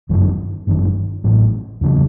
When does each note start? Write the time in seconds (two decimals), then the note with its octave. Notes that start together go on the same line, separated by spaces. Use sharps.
0.09 G1 F#2 D#3
0.67 G1 F#2 D#3
1.24 A1 A2 F#3
1.81 E2 C#3 F#3